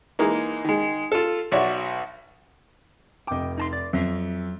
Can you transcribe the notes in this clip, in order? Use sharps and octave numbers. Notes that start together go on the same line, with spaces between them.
E3 G#3 A#3 D#4
D#3 G#3
F4 A4
B1 F#4 C#5 D5 E5
F1 D#5 G5 D6
D#4 A5 C6
D5
F2 F#3 E5